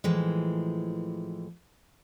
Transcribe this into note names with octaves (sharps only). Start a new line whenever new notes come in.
A2 E3 F3 G#3